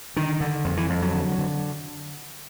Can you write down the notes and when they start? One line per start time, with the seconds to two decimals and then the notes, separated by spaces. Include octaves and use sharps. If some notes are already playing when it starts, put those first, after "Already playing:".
0.16 D3 D#3
0.40 D3
0.65 F2
0.77 E3
0.90 F2
1.02 F#3
1.14 D3
1.39 D3